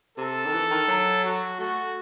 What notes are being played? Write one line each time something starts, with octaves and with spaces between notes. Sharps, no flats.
C3 A4
D#3
E3
D#3
F#3
F#4
A3 F#4